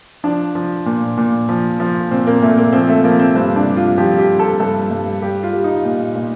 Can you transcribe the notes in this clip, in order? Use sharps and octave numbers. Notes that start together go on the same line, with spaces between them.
F3 D4
F3
A#2
A#2
F3
F3
A#2 C4
A#3
A#2 A3
A#3
F3 C4
A3
F3 A#3
C4
G2 C4
D4
G2
F4
F3 G4
G4
F3
A4
G2 A4
G2
G3 G4
F4
G3
D#4
A#2
A#2